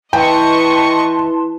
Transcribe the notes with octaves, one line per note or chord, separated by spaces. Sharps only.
E3 B4 D#5 G5 A5 C6 C#6